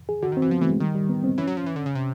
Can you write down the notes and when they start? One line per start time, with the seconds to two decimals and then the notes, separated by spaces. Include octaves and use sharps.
0.09 G#4
0.23 D3 F#4
0.32 D#3
0.37 C4
0.42 E3
0.51 F3 B3
0.61 E3 A3
0.71 G#3
0.80 D#3 G3
0.95 G3
1.10 B3
1.24 C4
1.38 E3 C#4
1.47 F#3
1.57 F3
1.66 E3
1.76 D3
1.86 C#3
1.95 C3